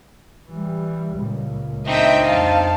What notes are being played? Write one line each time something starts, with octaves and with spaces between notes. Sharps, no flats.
E3 G3
C#2 A#2
C4 D4 D#4 D#5 E5 G5
F2 F5 A5